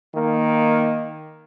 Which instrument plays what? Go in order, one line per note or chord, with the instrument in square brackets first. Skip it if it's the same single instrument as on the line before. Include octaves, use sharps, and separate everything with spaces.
[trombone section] D#3 A#3